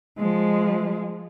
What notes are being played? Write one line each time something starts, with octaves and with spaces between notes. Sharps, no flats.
F3 G#3